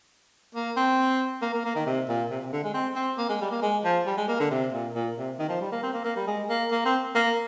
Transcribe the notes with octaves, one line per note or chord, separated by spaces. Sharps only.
A#3
C4
A#3
A#3
A#3
D#3
C3
A#2
C3
C3
D3
G#3
C4
C4
A#3
G#3
G3
A#3
G#3
F3
G3
G#3
A#3
D3
C3
A#2
A#2
C3
D#3
F3
G3
A#3
C4
A#3
A#3
G3
G#3
A#3
A#3
C4
A#3